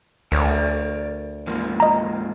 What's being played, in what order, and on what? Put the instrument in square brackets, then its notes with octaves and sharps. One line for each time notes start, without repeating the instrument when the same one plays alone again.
[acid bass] D2 [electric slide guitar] A#4 C#5 D5
[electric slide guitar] G#2 F3 A#3
[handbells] D#5 A#5